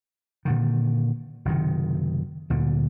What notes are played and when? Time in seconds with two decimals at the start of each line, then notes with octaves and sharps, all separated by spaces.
0.45 A#2 D3 D#3
1.45 F#1 C3 D#3
2.50 D2 A#2 D3